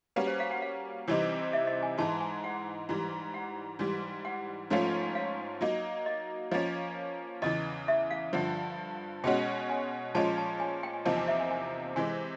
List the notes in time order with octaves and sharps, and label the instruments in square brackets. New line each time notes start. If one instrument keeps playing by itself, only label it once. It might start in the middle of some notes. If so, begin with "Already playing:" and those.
[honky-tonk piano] G3 A#3 C#4 F#4 [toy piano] B4
[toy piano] C5
F5
F#5
F5
[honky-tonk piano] C3 E3 G3 C4 D#4
[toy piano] E5
D#5
G#5
[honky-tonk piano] G#2 E3 G#3 [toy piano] A5
[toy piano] G#5
F#5
[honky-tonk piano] G#2 E3 G3
[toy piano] F#5
[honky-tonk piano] G#2 E3 G3
[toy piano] F#5
[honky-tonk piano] G#2 F3 A3 C#4 F4
[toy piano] F5
[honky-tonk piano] F#3 A#3 D#4
[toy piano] D#5
[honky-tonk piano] F3 A#3 C#4 [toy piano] D#5
[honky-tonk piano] E2 C#3 E3 [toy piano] D#5
[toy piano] E5
F5
[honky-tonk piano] G2 D3 F3 [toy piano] F#5
[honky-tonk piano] B2 G#3 C#4 F#4 [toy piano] G5
[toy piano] G#5
[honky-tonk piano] A#2 F3 G#3 C#4 [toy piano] A5
[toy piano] A5
G#5
G5
G#5
[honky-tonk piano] E2 C3 F3 A#3 D#4 [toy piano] A5
[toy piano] G#5
E5
G#5
G#5
[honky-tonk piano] C3 E3 G#3 [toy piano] G#5